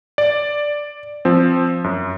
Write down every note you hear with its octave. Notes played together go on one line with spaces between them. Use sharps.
D5
F3 C4
F#2